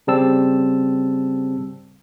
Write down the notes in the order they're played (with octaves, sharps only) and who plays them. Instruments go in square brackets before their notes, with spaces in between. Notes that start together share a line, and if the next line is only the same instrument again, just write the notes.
[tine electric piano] C#3 G3 C4 A5 E6